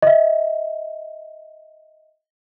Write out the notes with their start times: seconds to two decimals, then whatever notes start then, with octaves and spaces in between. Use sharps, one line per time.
0.02 D#5 E5